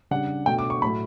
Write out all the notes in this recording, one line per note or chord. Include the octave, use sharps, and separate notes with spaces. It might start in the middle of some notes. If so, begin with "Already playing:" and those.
C#3 G3 D4 F#5
B2 A3 D4 G5
D6
C#6
A2 F#3 A3 B5